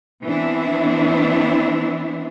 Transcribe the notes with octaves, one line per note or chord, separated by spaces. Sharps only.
E3 B3 C4 D4 E4